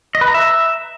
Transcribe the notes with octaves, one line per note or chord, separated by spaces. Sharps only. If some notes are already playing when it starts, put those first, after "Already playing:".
D#5
B4
A#5
E5